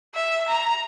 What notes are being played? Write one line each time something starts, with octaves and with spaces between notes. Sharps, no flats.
E5
A#5